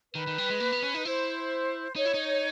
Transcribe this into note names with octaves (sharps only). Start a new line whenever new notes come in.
D#3 B4
D#3
G3
G#3
A#3
B3
C#4
D#4
E4 C5
D#4 C#5
E4
D#4